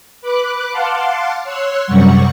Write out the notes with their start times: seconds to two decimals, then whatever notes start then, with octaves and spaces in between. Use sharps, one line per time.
0.21 B4 D6 F#6
0.71 F5 F#5 A5 C6 D6
1.44 C#5 C6 E6 F#6
1.86 F#2 C3 F#3 G3 F#5 C#6